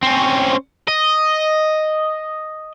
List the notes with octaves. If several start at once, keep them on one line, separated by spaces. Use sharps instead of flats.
C4 C#4
D#5